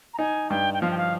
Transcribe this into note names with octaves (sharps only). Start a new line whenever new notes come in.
A#5
D#4 G#5
G2 G5
G5
F3 F5
G5
F5